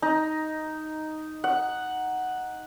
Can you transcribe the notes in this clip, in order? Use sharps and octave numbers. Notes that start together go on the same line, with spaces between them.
D#4
F#5